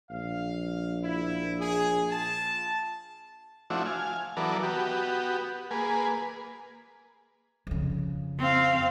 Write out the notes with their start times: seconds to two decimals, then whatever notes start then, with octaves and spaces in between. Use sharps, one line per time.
0.11 A#1 F5
1.04 E4
1.61 G#4
2.11 F4 A5
3.70 F3 A3 C4 D4 E4 F#4
3.86 F5 G#5
4.37 E3 F#3 B3 A4 A#4 D5
4.63 B3 F#4 G4
5.71 A#3 G#4 B4
7.67 F2 C#3
8.39 C4 F5